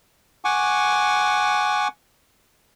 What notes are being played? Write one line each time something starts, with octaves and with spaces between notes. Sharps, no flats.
F#5 G#5 C#6 D6